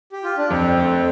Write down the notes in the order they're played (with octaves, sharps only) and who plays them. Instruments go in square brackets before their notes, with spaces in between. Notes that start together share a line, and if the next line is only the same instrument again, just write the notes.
[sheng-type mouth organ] G4
F4
D4
[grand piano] F2 [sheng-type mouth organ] C4
[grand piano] A3